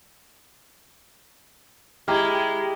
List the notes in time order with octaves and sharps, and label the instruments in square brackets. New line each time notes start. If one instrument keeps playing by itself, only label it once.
[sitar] G#3 [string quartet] E4 [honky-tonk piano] G4 [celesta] A#5 D6 F6